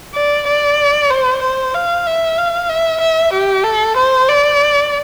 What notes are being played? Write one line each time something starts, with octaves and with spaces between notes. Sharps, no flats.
D5
D5
C5
C5
F5
E5
F5
E5
E5
G4
A4
C5
D5